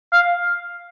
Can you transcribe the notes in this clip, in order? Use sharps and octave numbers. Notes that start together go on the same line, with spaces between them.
F5